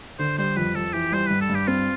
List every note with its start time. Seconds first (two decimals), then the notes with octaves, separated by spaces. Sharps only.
0.19 D3 C5
0.38 G3 C5
0.57 F2 B4
0.75 F2 A4
0.93 E3 G4
1.12 G3 C5
1.27 G2 B4
1.41 A4
1.50 G2
1.55 G4
1.68 C4 F4